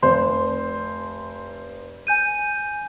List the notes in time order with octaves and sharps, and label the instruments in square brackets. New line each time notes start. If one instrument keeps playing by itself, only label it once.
[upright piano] F1 C5 [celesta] C6
[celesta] G#5 G6 D#7